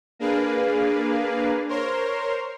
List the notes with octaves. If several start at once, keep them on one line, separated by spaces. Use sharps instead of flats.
A#3 D4 G#4 B4 F5
A#4 C5 C#5 C6 F6